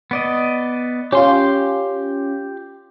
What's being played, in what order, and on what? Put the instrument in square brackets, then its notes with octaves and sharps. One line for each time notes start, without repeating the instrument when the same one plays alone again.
[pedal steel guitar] B3 D5 D#5
[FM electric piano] C#4 F4 [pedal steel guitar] G4 C6